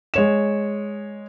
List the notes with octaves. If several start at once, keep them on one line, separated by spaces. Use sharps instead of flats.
G#3 C#5 E7